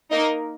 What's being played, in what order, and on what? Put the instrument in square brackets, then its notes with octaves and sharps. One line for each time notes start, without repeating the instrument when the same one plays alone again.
[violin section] A#3 D#4 A#4 D#5